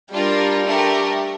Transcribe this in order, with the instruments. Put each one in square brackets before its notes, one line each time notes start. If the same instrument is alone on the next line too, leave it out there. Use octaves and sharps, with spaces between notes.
[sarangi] G3 [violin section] D4 F4 A#4
[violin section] A3 D4 G4 A#4